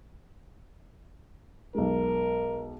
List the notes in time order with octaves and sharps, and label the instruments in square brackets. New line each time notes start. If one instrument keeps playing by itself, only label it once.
[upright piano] B1 G#3 [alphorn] A#4